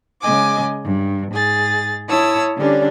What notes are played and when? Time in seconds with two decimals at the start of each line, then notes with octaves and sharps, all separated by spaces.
0.21 C#3 G#3 D#5 G#5 D6
0.84 G2
1.31 G#2 G#4 A6
2.08 E4 C#5 A5 D#6 E6
2.56 D3 G3 C#4 D4